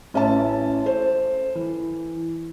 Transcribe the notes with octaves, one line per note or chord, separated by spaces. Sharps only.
A1 C#4 E5 A5
A4 C5
E3